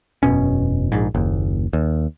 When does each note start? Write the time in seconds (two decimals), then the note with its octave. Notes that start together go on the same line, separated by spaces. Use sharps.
0.23 E1 F#2 B2 C#4
0.92 A#1 G#2
1.14 F#1 D#2
1.73 D#2